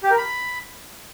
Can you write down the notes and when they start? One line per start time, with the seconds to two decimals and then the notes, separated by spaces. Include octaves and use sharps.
0.03 G4
0.10 A#4
0.18 B5